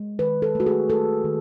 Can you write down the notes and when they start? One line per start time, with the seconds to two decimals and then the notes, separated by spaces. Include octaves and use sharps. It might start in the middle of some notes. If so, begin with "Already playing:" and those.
Already playing: G#3
0.19 D#3 B4
0.42 A4
0.55 A3 F#4
0.66 G#4
0.89 A3 A4
1.24 D#3